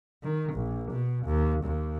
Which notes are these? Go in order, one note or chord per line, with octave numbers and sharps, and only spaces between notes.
D#3
A#1
B2
D#2
D#2